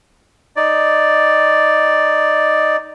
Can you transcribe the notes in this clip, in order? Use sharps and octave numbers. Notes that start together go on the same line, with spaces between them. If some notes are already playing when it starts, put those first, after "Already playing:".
D#4 D5